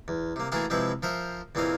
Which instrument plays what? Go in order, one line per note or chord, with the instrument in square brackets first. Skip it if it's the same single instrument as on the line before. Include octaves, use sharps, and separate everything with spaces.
[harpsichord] E2
C3 A#3
E3 A3 A#3 F#4 G#4 A#4
C3 F3 G#3 C4 E4 B4
F3 A#4 C5 E5
E2 A#2 E3 C4 D#5 F5